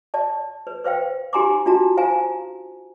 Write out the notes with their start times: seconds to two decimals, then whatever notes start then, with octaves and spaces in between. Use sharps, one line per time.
0.14 D5 A5
0.67 B4
0.84 B4 C5 F5 G5
1.33 D#4 G4 G#5 A#5 C6 D6
1.66 D4 F4 F#4 A5 A#5
1.97 C5 F5 G#5 A#5